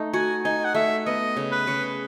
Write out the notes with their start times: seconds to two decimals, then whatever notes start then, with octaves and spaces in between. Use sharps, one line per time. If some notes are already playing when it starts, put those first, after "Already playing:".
Already playing: A3 D#4
0.14 F#4 G#5
0.44 D#4 G#5
0.64 F#5
0.75 A3 E5
1.06 B3 D#5
1.37 C#3
1.52 B4
1.67 C#3